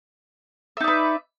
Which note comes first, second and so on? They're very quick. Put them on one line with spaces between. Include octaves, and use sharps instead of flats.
E5 D#4 D5 B4